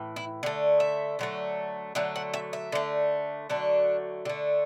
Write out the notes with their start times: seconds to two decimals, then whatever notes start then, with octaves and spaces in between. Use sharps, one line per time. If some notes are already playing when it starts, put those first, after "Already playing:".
Already playing: A2 E3
0.16 E4
0.43 D3 A3
0.80 E5
1.19 D3 F#3 A3
1.95 D3 F#3 A3 E5
2.16 F#5
2.34 E5
2.53 E5
2.72 D3 A3
3.50 D3 F#3 A3 D4
4.25 D3 A3